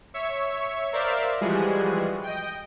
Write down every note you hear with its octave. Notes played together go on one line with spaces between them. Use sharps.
C#5 E5 C#6
A#4 C5 D5 E5 F5
E3 F3 G3 G#3 F#4 G#4
D#5 G5